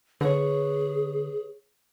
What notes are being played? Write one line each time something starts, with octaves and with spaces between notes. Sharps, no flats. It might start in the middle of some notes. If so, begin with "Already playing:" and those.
D3 G#4 B4 C#5